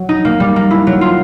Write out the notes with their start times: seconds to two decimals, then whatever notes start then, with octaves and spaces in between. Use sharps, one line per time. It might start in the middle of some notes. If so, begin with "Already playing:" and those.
Already playing: F#3
0.09 D#4
0.25 A#3
0.40 G3
0.56 A#3
0.71 E4
0.87 F#3
1.01 F4